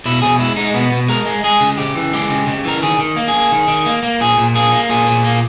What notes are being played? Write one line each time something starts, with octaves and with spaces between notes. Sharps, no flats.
B2 E4
B2 G#4
G#3 E4
G#3 D#4
B2 B3
B2
G#3 A#4
G#3
G#3 G#4
C#3
C#3 G4
E3
G#3 G4
C#3
C#3
E3 A#4
D#3 G#4
D#3
A#3
G#4
A#3
D#3
D#3
A#3
A#3
A#2 G#4
A#2
A#3 G#4
A#3
A#2 G#4
A#2
A#3